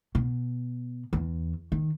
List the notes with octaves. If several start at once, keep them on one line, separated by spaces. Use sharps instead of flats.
B2
E2
D#3